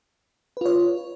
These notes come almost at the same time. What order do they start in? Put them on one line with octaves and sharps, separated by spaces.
B4 F4 C#5